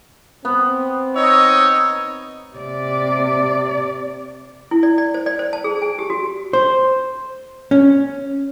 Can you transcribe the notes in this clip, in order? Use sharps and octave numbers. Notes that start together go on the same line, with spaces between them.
B3 C4
D#4 C#5 D#5 E6
C3 D5
E4
D5
D5
C5
D5
C5
A5
G#4
G#5
G4
F#4
C5
C#4